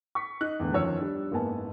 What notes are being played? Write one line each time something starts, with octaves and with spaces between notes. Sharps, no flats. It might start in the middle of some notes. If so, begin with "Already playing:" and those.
C#6 B6
D#4 F#6
E2 A2 D3 E3
F#2 D#3 F3 C#5 E6
G3 D4
F#1 G#2 A#3 B3 G#5 A5